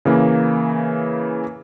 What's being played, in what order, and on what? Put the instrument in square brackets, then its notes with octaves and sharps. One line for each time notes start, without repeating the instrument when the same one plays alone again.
[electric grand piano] C#3 E3 A#3